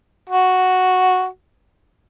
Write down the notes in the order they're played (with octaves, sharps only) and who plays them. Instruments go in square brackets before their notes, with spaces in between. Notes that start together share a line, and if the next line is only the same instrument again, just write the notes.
[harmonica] F#4